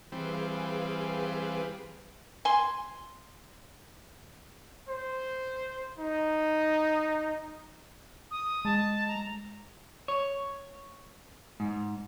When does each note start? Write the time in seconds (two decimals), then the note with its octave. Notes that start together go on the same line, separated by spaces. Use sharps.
0.12 E3 G3 C4 G#4 B4 F5
2.45 G#5 C6
4.89 C5
5.99 D#4
8.31 D#6
8.65 G#3 A5
9.08 A#5
10.08 C#5
11.60 G#2